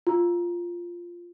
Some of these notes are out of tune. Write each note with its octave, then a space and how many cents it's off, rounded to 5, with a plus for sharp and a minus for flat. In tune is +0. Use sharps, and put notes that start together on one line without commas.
F4 -5